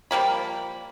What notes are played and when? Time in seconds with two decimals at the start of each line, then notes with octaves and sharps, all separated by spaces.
0.11 F3 G3 A#3 B5